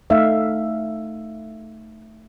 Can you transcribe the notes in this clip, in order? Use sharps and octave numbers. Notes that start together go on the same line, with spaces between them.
A3 D#4 E5 F5